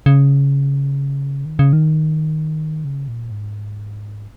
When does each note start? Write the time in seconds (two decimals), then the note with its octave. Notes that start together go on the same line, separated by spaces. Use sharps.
0.06 C#3
1.45 D#3
1.59 C#3
1.73 D#3
2.85 C#3
3.08 A#2
3.31 G#2